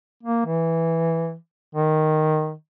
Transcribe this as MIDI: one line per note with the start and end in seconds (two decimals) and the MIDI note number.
0.23 0.46 58
0.46 1.35 52
1.75 2.53 51